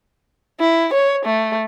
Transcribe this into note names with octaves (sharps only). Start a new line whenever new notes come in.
E4
C#5
A3